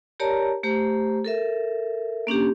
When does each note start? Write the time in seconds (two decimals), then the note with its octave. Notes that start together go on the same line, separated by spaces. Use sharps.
0.20 G4 A#4 C#5 D5 A5 A#5
0.63 A3 G4 C5 A#5
1.24 A4 A#4 E5
2.27 A#3 C#4 D4 G4